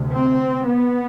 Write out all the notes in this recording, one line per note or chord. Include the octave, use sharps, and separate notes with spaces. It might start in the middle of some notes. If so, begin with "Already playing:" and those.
Already playing: D2 C3
C4
B3